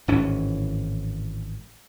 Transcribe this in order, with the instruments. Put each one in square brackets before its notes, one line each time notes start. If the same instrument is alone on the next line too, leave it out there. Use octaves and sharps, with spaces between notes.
[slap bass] G#1 A2 E3 C#4